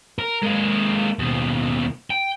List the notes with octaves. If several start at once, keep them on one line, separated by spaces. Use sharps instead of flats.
A#4
G#3 A#3
D#2 B2
G5